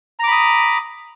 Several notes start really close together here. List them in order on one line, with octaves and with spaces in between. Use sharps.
A#5 D6 B5 D#6